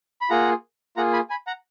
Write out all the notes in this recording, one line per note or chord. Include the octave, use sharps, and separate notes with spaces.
B5
A#3 F4 G#4 F#5 A#5
A#3 F4 G#4 F#5 A#5
G#5 B5
G#5 B5
F#5 A#5